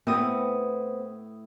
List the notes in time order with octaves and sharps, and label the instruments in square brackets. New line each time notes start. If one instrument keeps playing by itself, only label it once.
[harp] A2 D#6 [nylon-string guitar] B3 C4